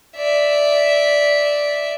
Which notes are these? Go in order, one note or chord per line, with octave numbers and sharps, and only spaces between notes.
D5 E5